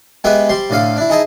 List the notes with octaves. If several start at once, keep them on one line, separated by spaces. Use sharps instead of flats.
G#3 B3 G4 B4 E5
G3 C5 C6
A2 D3 A4 F5
D4 E4
D#4 E4 G#4 D#5 A5